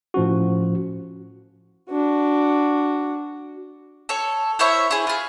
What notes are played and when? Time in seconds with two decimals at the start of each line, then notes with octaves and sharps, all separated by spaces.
0.14 A2 F3 C#4 F#4
1.90 D4 F#4
4.09 A4 C#5
4.59 E4 C5 C#5 E5
4.91 E4 G#4
5.07 F4 G#4